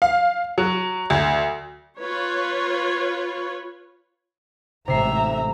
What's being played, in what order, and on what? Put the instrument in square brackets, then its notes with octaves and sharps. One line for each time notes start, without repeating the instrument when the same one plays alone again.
[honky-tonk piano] F5
F#3
D2
[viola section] F4 B4 C#5
[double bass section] A1 G#2 [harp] C3 C7 [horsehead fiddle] E5 A#5